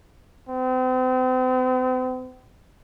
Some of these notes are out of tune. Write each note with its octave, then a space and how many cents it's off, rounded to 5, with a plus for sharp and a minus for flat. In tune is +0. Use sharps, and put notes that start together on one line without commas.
C4 -40